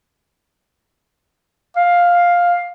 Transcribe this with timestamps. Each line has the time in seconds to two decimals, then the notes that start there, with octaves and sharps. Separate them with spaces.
1.76 F5